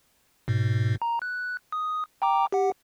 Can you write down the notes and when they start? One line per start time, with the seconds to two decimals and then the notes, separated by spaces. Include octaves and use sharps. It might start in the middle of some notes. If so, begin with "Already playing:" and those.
0.48 G#2 B2
1.02 A#5
1.22 F#6
1.72 D#6
2.22 G5 A#5 D6
2.52 G4 F#5